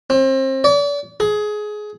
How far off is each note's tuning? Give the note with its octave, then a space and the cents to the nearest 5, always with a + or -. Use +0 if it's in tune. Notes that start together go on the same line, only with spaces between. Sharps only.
C4 +30
D5 -40
G#4 +20